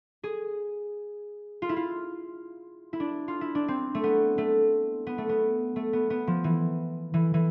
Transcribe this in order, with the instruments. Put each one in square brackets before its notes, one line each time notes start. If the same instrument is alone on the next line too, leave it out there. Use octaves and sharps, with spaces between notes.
[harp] G#4
F4
E4
F4
E4
D4
F4
E4
D4
C4
A3
B3
A3
B3
A3
B3
A3
B3
B3
F3
E3
E3
E3